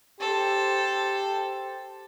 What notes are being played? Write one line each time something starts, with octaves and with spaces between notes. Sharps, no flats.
G4 A4 C5